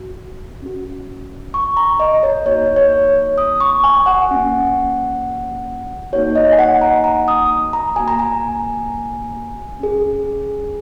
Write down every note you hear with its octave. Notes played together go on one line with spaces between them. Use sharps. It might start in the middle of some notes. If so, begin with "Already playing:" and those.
Already playing: F#4
C#4 F#4
C#6
A#5
D#5
C#5
A#3 D#4 F#4 C#5
C#5
D#6
C#6
G#5
F#5
A#3 C#4 F#4
A#3 D#4 F#4 C#5
D#5
G#5
F#5
A#5
A#5
D#6
A#5
A#3 F#4 G#5
A#5
G#5
C#4 G#4